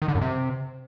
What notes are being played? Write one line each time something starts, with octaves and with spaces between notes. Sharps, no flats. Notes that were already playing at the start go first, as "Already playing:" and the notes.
D#3
D3
F#2
C3